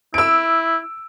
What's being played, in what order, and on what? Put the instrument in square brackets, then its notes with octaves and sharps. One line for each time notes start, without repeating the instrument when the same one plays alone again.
[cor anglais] E4 [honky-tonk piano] E6 D7